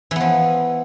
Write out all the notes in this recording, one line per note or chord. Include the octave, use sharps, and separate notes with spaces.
E3 F3 B3